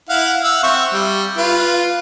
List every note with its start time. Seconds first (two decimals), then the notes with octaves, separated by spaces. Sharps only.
0.09 E4 F5 F#5
0.44 F5 F#5 E6
0.63 C4 E5 C#6
0.93 G3
1.38 F4 B4